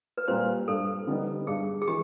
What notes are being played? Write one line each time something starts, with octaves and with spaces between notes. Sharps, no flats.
B4
A#2 G3 A#3 C5
G2 A4
D3 G3 B3 D#4
G2 G#4
G#4
E3 G#3 G4